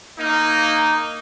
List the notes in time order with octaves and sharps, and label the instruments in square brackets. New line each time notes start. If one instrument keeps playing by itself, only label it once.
[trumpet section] A#3 D#4